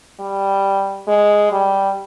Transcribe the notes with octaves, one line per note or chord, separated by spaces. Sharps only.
G3
G#3
G3